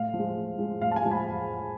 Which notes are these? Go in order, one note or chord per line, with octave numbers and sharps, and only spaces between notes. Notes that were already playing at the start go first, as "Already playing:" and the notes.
Already playing: A2 F5
F3
G#3
A2
F3 G#3
A2 F5
A5
F5 G#5
F3 G#3
G#5 B5